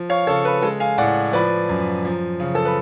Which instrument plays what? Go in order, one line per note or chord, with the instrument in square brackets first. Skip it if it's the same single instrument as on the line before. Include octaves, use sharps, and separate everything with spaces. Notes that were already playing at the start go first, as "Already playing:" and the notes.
Already playing: [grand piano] F3
C#5 F5
C#3 A4 C#5
B4
G#3 A4
F5 G#5
A2 D5 F#5
F3 B4 D5
F#2
F3
C#3
A4
B4